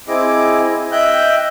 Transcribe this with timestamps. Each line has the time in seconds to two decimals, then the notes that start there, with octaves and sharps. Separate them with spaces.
0.08 C4 E4 G#4 D#5 D6
0.92 D#5 E5 G5 F#6 G6